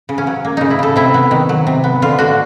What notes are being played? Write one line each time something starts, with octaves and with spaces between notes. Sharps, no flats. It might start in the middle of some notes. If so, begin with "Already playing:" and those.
C#3
C#4
F#3
A#3
C#3 D#4
E4
C#3 A4
C3 E4
B3
D#3
F#3
C3
B3
D3 F4
D3 F#4